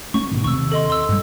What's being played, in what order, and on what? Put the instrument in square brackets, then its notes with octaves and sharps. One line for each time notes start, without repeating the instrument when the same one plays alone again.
[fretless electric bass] A3 C#4 [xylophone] C#6
[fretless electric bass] G#1 B2 D#3
[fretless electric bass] D#2 C3 [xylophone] C#6 E6
[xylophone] A4 D#5 C6
C6 E6
[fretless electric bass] G2 G3